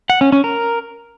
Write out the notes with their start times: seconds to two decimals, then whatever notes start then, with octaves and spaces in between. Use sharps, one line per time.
0.10 F#5
0.21 C#4
0.32 C#4
0.44 A#4